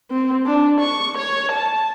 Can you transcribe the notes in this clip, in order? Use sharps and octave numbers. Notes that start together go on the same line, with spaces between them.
C4
D4
C#6
C#5
A5